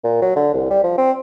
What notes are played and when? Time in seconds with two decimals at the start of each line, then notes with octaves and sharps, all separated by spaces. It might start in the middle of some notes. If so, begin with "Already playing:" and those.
0.04 A#2
0.22 F#3
0.36 D3
0.54 C2
0.70 G3
0.84 F3
0.98 C4